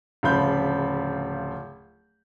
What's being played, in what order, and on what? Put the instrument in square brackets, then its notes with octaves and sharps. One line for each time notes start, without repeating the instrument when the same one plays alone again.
[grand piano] D1 C#3 F3 B5 G6